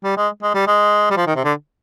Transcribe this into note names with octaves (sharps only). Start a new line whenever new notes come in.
G3
G#3
G#3
G3
G#3
G3
F3
D#3
C3
D3